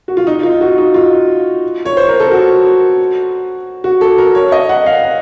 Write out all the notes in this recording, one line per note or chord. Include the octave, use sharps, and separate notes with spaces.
F#4
F4
D#4
F4
F#4
D#4
F4
C#5
C5
A#4
A4
F#4
F#4
A4
A#4
C#5
D#5
F#5
F5
F#5